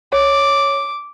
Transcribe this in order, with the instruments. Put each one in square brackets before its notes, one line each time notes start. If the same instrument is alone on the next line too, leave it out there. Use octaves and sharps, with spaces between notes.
[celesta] C#5 [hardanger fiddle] D6